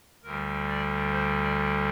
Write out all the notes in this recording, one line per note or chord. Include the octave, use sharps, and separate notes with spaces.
D2 D3 G3 A#4
D5
C5
D5